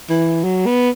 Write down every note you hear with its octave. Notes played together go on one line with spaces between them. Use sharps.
E3
F#3
B3